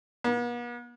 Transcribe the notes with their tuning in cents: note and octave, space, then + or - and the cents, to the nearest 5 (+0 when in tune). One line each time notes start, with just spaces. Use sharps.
B3 -45